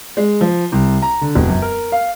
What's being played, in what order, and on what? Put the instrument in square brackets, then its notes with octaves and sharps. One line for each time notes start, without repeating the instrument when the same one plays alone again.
[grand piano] G#3
F3
C2
A#5
D3
E1
F#2
A#4
F5